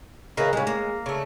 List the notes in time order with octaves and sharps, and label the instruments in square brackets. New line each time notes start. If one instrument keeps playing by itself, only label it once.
[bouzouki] C#3 E3 A#3 [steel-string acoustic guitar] A#4 B4 D#5
[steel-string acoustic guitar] C#3 G3 [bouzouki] G#3
[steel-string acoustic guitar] A#3
[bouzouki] C#3 A3